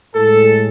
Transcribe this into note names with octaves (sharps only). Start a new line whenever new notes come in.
A2 G#3 A4